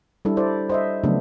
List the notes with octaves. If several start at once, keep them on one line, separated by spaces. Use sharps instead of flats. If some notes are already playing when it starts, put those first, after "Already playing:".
G3 D4 E4 A4
E4 A4 C5 D5
C5 D#5 E5
C#3 F3 F#3 A3 B3 D4